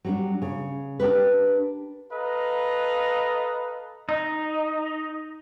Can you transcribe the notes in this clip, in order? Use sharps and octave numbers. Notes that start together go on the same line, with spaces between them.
F#3 G3 D4
C#3
D4 G4 A#4 B4
A4 B4 D#5 F5 A#5
D#4